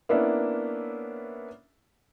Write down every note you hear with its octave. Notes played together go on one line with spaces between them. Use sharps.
A#3 B3 C#4 D4 E4 E5